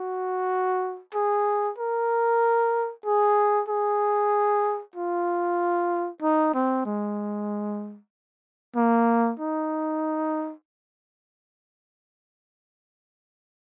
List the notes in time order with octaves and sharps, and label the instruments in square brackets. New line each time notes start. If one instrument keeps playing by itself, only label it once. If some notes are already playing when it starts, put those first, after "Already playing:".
Already playing: [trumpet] F#4
G#4
A#4
G#4
G#4
F4
D#4
C4
G#3
A#3
D#4